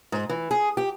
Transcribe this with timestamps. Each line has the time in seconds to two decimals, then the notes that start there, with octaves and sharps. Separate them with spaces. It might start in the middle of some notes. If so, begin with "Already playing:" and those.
0.12 G#2
0.29 E3
0.51 G#4
0.77 G4